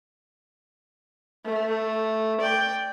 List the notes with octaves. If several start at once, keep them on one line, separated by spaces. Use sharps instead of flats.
A3
D5 G5